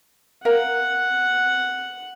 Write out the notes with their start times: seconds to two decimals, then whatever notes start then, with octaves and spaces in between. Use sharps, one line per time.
0.45 A#4 F5 F#5